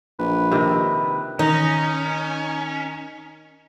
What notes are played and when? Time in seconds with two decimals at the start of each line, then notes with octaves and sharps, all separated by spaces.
0.19 A#1 B4
0.52 C3 D#3
1.39 D#3 C#4 D#4